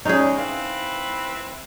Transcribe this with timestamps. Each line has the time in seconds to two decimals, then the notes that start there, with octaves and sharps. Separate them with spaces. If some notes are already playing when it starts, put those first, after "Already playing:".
0.05 E2 C#3 G#3 C#4 D#4 G#4 D5
0.38 C4 E4 B4 F5